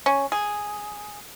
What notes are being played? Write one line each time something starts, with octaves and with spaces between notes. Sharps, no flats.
C#4
G#4